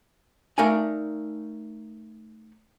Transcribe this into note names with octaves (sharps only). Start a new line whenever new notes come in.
A3 D#4 A#4 D5 F5 G#5